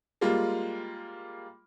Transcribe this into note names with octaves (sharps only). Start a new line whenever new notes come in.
G3 G#3 A#3 F4